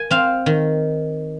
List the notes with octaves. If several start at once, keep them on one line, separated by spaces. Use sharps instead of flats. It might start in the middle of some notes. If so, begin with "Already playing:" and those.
Already playing: A#4 G#5
C4 F5
D#3